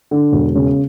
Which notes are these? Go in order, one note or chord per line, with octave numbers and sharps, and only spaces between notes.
D3
E1
C#3